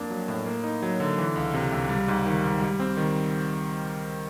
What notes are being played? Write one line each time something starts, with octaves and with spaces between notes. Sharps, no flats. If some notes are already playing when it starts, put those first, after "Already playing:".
Already playing: F2 A#3 D4
F#3
A2
A#3
D#4
F#3
D3
E3
C#2
C3
C#2
G3
G#2
D#3
G#2
G3
C4
D#3